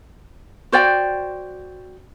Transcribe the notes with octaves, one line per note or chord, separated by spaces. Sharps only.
F#4 C5 D5 G5